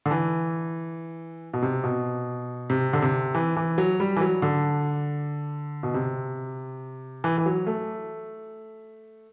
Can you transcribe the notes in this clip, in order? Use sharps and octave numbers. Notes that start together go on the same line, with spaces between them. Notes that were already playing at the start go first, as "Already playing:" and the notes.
D3
E3
B2
C3
B2
C3
D3
C3
E3
E3
F#3
G3
E3
F#3
D3
B2
C3
E3
E3
F#3
A3